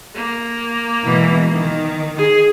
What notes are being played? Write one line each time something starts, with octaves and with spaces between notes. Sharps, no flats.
A#3
B2 E3 G#3
D#3
G#4